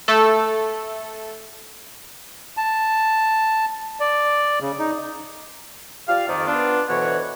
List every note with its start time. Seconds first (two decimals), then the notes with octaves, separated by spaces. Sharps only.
0.08 A3 A4
2.57 A5
4.00 D5
4.61 C#3
4.79 D#4
6.08 F4 G4 D5 F5
6.27 F2 D#3 D5
6.46 B3 D4 F4
6.89 D2 B2 E3 F#4 C#5 F#5